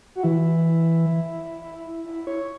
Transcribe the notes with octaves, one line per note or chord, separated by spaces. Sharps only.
F#4
E3 E4
E4
C#5